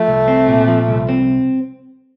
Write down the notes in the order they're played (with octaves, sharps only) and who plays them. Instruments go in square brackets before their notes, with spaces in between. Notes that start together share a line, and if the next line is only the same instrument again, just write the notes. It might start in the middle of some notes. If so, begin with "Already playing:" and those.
Already playing: [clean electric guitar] F3 [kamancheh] A3
[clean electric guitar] C2
C4
A#2
F3
C2
C4